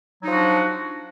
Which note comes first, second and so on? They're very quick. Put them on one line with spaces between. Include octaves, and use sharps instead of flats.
F#3 D#4 F3 F#4 D4